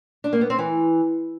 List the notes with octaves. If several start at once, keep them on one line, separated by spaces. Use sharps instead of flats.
D4
A#3
B3
C4
E3